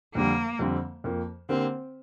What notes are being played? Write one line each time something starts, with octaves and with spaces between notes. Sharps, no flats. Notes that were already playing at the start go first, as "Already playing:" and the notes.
F2 D3 G3 A#3
F2 D3 G3 C4
F2 F3 A#3
D3 A#3 C4 G4